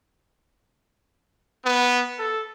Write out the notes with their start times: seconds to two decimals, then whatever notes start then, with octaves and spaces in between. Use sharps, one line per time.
1.65 B3
2.18 A4